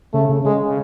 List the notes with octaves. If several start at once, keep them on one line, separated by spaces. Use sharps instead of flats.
C#3 A3
C#3
C#3 G#3
C#3